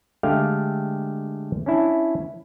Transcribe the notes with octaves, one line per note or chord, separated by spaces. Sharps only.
D3 G#3 A3 G4 F5 G5
C#4 D4 E4